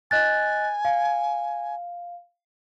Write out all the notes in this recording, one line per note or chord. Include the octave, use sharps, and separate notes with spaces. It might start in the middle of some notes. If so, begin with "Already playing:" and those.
D#5 G#5 F#6 A6
F5